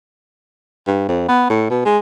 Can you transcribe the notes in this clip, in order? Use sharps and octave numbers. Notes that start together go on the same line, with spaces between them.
G2
F2
B3
A2
B2
G#3